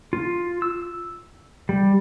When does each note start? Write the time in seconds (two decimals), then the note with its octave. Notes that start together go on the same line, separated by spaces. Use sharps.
0.13 F4
0.62 E6
1.69 G3